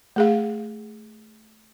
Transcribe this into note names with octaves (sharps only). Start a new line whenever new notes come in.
A3 G#4 F5